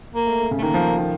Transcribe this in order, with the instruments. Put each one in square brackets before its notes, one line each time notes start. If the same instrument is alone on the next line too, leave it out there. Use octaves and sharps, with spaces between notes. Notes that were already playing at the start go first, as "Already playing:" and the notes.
[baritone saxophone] A#3
[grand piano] A3
A3
C#3
[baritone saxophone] A3
[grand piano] D#3 [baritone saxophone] A#3
[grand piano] F3
D#3